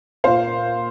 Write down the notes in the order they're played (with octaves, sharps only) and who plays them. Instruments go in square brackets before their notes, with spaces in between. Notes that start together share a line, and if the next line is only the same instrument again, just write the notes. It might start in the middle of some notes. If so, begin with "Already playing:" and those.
[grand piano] A#2 A#3 F4 C5 F5